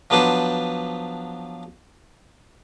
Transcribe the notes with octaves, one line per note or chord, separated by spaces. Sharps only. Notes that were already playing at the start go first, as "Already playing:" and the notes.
F3 F#3 B3 D4 B4 C5